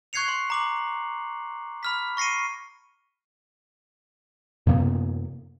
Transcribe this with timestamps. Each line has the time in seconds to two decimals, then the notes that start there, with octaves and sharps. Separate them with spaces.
0.13 C#6 F#6 G#6 C7 C#7 F7
0.28 C6
0.50 A#5 D6 F#7
1.83 B5 F6 B6
2.17 C#6 A#6 C7 C#7 D#7
4.67 F#2 C3 A#3 B3